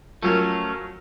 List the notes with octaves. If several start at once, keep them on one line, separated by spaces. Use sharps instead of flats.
F3 F#3 A3 C#4 A#4